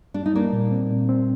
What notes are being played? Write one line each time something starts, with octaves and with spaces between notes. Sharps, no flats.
G3 D4
D#4
G3 A#3 D4
A#2
C4
A#2
C4